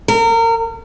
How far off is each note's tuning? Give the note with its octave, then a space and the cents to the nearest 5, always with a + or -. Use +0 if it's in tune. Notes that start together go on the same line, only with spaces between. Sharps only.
A#4 -30